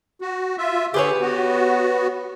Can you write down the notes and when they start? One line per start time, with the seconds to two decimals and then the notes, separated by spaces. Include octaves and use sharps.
0.21 F#4
0.58 F4 E5
0.94 D3 G4 G#4 B4 C#5
1.21 B3 F#4